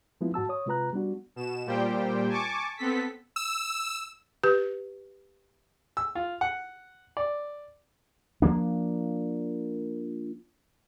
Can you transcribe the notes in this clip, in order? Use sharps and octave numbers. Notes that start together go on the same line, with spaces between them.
F3 G#3 B3 C4 E4 F4
G#2 F#4 A5 E6
C#5 D#6
C3 G#3 F4 B4 A#5 F#6
G3 B3 D4 F#4
B2 E7
A#2 G3 G4 C5 G5
G#5 A5 C#6 D6
B3 C4 A4 B6
E6
G4 B4
E6
F4
F#5
D5
F3 F#3 A#3 D4